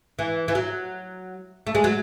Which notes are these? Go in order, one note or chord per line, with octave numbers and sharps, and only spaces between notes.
E3
E3
F#3
A3
G#3
F#3